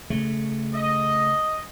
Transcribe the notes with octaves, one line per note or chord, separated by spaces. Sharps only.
C#3 A3
D#5